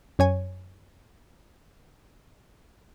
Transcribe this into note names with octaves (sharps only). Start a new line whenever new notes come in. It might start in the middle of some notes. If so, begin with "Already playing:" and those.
F#2 C#5 G#5